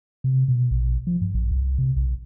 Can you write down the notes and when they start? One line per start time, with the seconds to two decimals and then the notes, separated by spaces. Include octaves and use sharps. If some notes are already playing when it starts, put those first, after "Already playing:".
0.24 C3
0.48 B2
0.71 A#1
1.07 F3
1.21 G2
1.35 A#1
1.51 C2
1.79 C3
1.96 B1